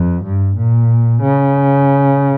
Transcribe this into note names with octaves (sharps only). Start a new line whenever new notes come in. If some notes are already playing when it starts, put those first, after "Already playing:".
Already playing: F2
G2
A#2
C#3